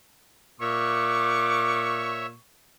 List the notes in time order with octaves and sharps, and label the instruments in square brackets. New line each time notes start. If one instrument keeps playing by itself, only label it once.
[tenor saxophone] A#2 [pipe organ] C#5 E5 [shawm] C#6 [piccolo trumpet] D6